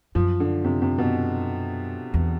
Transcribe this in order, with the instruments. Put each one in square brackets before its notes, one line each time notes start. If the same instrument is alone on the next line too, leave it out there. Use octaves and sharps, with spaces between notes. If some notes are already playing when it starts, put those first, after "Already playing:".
[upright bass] F#2 [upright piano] F3
[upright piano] D3
C3
C3
B2
[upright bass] E2